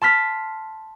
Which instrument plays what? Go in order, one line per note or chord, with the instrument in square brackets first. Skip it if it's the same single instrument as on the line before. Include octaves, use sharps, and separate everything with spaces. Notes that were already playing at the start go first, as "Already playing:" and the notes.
[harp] A5 C6 F6 B6